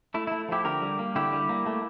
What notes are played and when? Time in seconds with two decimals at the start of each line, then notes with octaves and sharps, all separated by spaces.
0.14 A3 E4
0.27 A3 E4
0.49 F3 E4 G4
0.65 D3 G4 A#4
0.82 G3
0.99 A#3
1.15 D3 E4 G4
1.33 G3
1.49 A#3
1.66 A3